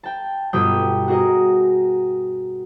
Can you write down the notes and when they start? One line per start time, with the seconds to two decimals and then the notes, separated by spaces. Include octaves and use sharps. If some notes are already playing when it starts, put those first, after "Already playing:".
0.03 G5 A5
0.53 G1 B2 G4 G5 D#6
1.08 F#4 G#4 A#4 D#5